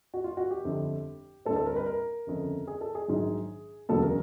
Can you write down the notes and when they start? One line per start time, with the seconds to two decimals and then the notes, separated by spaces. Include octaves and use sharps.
0.14 F#4
0.24 F4
0.37 F#4
0.51 G4
0.65 G1 F2 D3
1.45 D2 D3 G3 C4 A4
1.56 A4
1.66 A#4
1.76 B4
1.86 A#4
2.27 G1 F2 C#3
2.67 G#4
2.81 A4
2.95 G#4
3.08 A#1 G#2 D#3 F#3
3.89 E1 D2 C#3 F#3 B3 A4
4.02 A#4